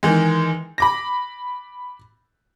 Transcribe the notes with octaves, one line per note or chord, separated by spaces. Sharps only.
D#3 E3 G#3
B5 D6 A#6